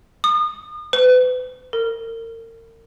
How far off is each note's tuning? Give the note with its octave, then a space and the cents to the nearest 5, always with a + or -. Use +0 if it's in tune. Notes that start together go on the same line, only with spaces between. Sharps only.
D#6 -35
B4 +40
A#4 -40